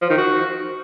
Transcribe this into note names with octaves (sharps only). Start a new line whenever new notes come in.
F3
D#3
F#4